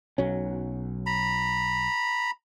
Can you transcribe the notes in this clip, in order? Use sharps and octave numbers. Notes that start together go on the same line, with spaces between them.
B1 F#3 C#4
A#5 B5